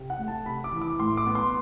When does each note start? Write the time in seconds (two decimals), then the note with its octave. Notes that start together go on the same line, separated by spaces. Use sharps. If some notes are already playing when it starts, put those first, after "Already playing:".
Already playing: C3
0.10 F#5
0.19 A3
0.28 A5
0.46 C3 B5
0.64 D6
0.73 E3
0.82 D6
0.99 A2 C6
1.17 D6
1.27 B3
1.35 C6